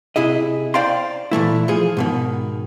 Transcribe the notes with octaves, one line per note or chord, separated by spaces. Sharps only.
C3 E4 G#4 D#5
C5 D5 F5 G5 A#5 C6
A#2 E3 A3 E4
F3 G#4
G#2 B2 D#3